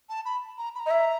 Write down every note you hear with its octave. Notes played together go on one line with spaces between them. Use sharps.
A5
B5
A#5
B5
A#5
D#5
E5